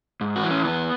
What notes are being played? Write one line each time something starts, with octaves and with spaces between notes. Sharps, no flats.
G#2
F#4
E3
C#4
E2 B3